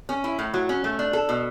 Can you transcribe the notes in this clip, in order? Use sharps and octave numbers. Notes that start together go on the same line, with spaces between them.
C#4
E4
A2
F#3
C#4
A3
D4
A4
B2